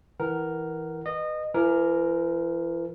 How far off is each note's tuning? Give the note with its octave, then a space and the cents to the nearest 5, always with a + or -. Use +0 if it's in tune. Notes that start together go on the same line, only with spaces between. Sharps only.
E3 -10 A#4 +0 F#5 +25
B4 +0 D#5 -20
E3 +40 A#4 +0